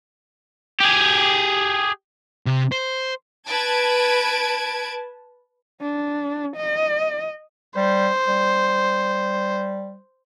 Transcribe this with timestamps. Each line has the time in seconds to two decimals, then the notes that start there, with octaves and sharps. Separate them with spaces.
0.81 G4 G#4
2.46 C3
2.72 C5
3.48 B4 A5 G#6 D7
5.81 D4
6.57 D#5
7.76 G3 C5
8.28 G3